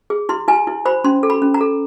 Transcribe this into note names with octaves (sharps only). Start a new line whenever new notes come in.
G#4
E4 C6
E4 G#5
E4
C5 B5
C#4 C6
A4
B5
C#4
A#5
A4